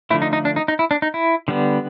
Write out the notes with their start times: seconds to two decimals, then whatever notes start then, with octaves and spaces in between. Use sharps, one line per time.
0.10 D3 F3 A3 E4
0.22 D#4
0.33 D#4
0.45 D4
0.56 D#4
0.68 D#4
0.79 E4
0.91 D4
1.02 D#4
1.14 E4
1.48 D3 G3 B3